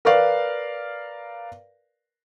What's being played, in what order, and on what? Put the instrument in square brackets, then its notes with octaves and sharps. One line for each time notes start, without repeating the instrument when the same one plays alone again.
[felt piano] A#4 B4 D5 F5